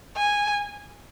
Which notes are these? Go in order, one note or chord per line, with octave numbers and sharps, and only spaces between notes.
G#5